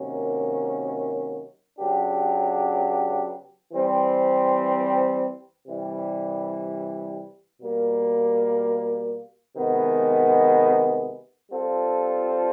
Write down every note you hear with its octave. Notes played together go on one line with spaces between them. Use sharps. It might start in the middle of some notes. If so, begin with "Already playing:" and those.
Already playing: C3 D#3 F#3 A#3 C#4
C#3 F#3 B3 D4 G4
E3 G3 C4
C3 E3 G3
B2 G3 A#3
C3 D#3 G#3 B3
G3 C4 F4 A4